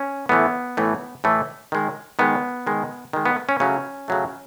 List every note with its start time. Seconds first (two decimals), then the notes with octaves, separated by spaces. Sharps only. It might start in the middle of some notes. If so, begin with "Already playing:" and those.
Already playing: C#4
0.29 A2 E3 A3 B3
0.77 A2 E3 A3
1.24 A2 E3 A3
1.72 D#3 G#3
2.19 D#3 G#3 B3
2.67 D#3 G#3
3.13 D#3 G#3
3.26 B3
3.49 C#4
3.60 C#3 F#3 A3 C#4
4.08 C#3 F#3 A3